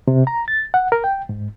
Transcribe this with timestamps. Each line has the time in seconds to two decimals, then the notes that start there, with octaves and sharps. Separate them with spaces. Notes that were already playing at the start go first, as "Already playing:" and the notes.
0.08 C3
0.27 A#5
0.48 A6
0.74 F#5
0.92 A#4
1.04 G5
1.29 G#2